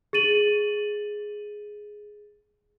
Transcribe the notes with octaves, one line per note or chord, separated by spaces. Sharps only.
G#4 A6 D#7 F#7